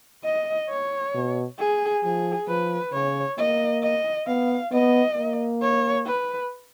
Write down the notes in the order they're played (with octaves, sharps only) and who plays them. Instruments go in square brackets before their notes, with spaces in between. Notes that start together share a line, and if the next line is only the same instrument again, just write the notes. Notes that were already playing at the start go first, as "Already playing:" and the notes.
[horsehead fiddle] D#5
C#5
[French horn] B2
[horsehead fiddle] G#4
[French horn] F3 [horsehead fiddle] G#4
[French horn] F3 [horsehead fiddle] B4
[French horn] C#3 [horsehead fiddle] C#5
[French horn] A#3 [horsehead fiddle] D#5
[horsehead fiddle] D#5
[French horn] B3 [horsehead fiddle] F5
[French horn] B3 [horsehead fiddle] D#5
[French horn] A#3
[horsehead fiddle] C#5
B4